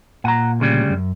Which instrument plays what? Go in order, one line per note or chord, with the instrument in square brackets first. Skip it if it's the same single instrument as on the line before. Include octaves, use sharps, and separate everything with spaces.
[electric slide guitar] A#2 [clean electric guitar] F#5 A#5
[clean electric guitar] D2 C#3 G3
[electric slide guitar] F#2